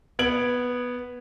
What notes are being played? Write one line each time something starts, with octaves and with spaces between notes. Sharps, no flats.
B3 G#6 D7 F#7